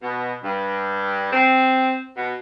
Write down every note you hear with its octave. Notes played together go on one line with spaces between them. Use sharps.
B2
G2
C4
B2